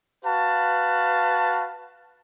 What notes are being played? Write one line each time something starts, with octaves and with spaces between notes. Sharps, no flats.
F#4 B4 F5 A5